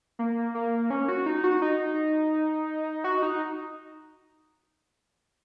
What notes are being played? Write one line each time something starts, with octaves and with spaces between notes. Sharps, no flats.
A#3
A#3
C#4
F#4
D#4
F#4
D#4
F#4
D#4